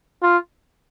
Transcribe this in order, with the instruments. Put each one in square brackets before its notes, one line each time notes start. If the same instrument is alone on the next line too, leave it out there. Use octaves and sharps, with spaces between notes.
[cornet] F4